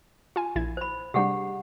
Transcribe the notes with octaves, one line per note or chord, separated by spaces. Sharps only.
F4 G#5
A#1 E4 G#6
C5 B5
C3 G3 D4 G4 G#4 F#5